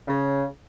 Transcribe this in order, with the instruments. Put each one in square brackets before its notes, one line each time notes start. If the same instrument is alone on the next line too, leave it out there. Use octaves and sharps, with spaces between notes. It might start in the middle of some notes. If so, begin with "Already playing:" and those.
[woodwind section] C#3